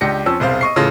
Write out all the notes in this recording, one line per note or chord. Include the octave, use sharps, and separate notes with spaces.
C#2 D4 G4 A#6 C#7
F2 F3 C#4 E6
E1 C2 C5 F5
D#5 C#6 C7
A1 C#3 E3 F4 A4 A#6